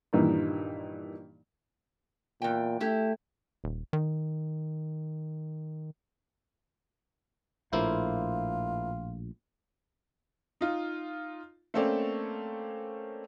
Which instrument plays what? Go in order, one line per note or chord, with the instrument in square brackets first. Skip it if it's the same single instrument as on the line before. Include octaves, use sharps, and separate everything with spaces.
[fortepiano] G2 A#2 D#3 E3 A#3 D#4
[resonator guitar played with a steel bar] E2 G5 [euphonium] A#2
[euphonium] A3 [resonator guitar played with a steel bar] E4 G4
[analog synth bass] D#1
D#3
[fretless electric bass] A#1 A2 [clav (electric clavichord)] A#3 E4 C5 [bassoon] F4
[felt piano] D#4 F4
A3 A#3 C4 C#4 A4 D5